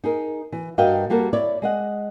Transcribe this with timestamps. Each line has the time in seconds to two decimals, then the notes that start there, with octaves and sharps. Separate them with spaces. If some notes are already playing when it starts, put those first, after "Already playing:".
0.04 D#4 G#4 A#4
0.52 E3
0.78 G2 F#4 A#4 D#5 F5 G5
1.10 G3 A#3 F#4 A4 A#4
1.33 E4 C#5 D5
1.62 G#3 D#5 F#5